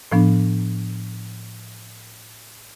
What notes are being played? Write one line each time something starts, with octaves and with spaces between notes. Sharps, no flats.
A2 F3 B3 D4